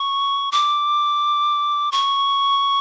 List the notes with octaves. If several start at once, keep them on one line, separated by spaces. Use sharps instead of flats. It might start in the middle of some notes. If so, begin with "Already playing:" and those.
Already playing: C#6
D6
C#6